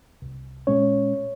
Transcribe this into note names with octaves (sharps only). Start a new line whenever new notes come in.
C2
A#2 G#3 C#4 C#5